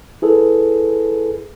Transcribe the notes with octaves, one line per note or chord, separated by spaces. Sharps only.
E4 G#4 A4 B4